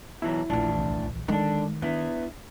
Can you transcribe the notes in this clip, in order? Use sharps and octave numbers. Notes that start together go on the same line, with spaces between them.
B2 E3 F#3 E4
A#1 E2 A2 E3 D4
C2
D3 D#3 G#3 D4
B3 D4 E4